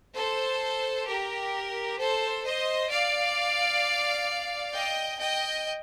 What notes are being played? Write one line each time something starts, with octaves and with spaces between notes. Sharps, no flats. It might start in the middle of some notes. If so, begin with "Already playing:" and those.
A4 C5
G4 A#4
A4 C5
C5 D#5
D5 F5
D#5 G5
D#5 G5